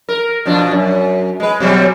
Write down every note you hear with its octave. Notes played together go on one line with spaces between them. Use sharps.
A#4
B2 F3 D4
F#2
G#3 B4
B2 F#3 G3